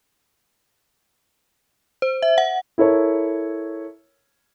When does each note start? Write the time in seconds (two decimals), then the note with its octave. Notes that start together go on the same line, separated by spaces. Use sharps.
2.02 C5
2.22 E5
2.38 F#5
2.78 E4 A4 A#4 C#5